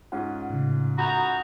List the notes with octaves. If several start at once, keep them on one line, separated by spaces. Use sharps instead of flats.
G#2 C#4 F4 F#5
A2 C#3
F#4 A#5 B5 D#6 G6